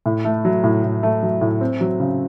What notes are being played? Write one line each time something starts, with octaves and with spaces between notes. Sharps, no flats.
A2
A3
F#3
A2
A2
A3
F#3
A2
C4
F#3
C#3